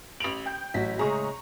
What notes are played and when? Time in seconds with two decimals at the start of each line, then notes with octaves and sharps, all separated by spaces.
0.20 A1 D7 F7 F#7
0.46 G5 G6
0.74 A1 F#3 E4 F#4 B6
0.99 A2 C#3 G#3 G#4 A#5 C#6